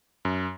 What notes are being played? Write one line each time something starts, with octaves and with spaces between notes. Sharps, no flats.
F#2